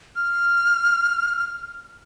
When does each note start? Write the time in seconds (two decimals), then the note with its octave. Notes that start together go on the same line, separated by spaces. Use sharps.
0.16 F6
1.38 F6